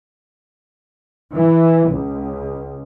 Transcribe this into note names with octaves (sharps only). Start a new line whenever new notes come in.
E3
C#2